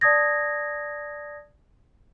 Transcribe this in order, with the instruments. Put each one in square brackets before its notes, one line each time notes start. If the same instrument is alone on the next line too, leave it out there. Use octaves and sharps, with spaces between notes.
[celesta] D5 A5 D#6 G#6 A#6